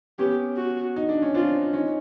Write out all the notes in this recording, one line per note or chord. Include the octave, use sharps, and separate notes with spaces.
B3 C#4 G4
F#4
D#4
D4
C#4
C4 D4 F4
C#4 D#4